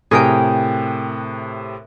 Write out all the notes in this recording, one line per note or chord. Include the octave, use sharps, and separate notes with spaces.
A2 C3 G#4 A#4 G5